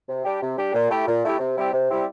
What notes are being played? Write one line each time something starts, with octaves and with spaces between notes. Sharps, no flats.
C3
G3 D4 G4
C3
G3 D4 G4
A#2
A3 E4 G4
A#2
A3 E4 G4
C3
G3 C4 E4 G4
C3
G3 C4 E4 G4